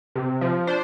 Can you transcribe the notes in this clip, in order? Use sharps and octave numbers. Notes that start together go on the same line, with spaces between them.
C3
F3
D4 C5